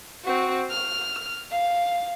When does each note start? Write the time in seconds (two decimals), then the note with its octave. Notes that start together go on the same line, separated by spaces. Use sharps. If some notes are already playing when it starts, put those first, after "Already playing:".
0.24 C4 F#4
0.70 F6
1.51 F5